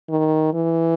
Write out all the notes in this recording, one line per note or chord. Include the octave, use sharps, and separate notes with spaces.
D#3
E3